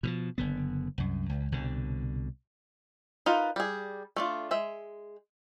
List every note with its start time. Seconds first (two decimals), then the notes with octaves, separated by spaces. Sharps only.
0.03 B2 E3 F3
0.38 F#1 D3 B3
0.98 C2 F#2
1.29 C#2
1.52 C2 B2 D3
3.26 D#4 F4 A#4 B4
3.56 G3 G#4
4.16 A3 D4 F4
4.51 G#3 E5